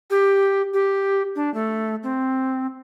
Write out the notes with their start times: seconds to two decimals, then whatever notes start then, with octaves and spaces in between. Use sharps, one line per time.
0.10 G4
0.74 G4
1.36 D4
1.54 A3
2.03 C4